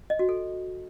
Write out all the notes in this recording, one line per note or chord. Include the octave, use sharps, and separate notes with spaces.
D#5
F#4
A4